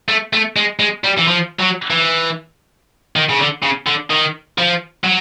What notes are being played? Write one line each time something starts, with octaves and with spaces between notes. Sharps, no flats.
A3
A3
G#3
G#3
G3
E3
F3
F#3
E3
D#3
C#3
D3
C#3
D3
D#3
F3
F#3